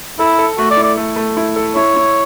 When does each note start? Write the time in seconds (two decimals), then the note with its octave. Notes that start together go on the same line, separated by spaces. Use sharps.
0.19 E4 A4
0.38 A4
0.58 A3 F#4
0.71 D5
0.77 E4
0.84 D5
0.97 A3
1.16 A3
1.37 E4
1.56 A4
1.76 E4 C#5
1.96 E4